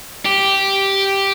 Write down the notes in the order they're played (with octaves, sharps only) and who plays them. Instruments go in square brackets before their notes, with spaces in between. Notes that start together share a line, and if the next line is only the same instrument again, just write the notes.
[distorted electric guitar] G4